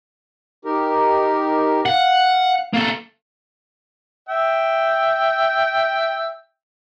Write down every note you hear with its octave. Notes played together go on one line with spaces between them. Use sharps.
D#4 G4 A#4
F5 F#5
A#3 A4
E5 G5